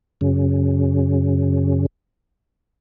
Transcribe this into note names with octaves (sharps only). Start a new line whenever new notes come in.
F#2 C#3